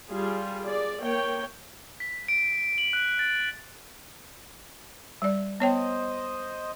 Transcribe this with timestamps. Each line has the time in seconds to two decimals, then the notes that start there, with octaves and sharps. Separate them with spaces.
0.10 G3 F4 G#4
0.64 G#4 D5
1.00 A#3 C#5 G5
2.00 B6
2.28 D7
2.78 F#7
2.93 F#6
3.19 A6
5.22 G3 D5
5.60 B3 C5 C#5 D#5 G5